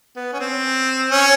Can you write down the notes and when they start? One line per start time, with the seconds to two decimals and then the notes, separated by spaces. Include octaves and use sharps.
0.16 B3
0.33 C#4
0.40 C4
1.10 C#4